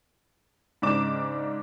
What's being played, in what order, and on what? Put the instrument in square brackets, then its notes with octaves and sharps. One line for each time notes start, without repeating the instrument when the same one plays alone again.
[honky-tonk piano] G#2 C#3 D4 D6 E7